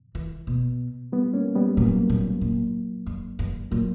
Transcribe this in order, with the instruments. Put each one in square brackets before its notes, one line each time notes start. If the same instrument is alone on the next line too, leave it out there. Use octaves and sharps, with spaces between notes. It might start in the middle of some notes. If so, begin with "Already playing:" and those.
[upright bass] E3
B2
[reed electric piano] G3 B3
A#3 C#4
G3 B3
[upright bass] A#2 [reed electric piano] F#3 A#3
[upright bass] A#2
A#2
G2
G2
[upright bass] A#2 [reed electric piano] F#3 A#3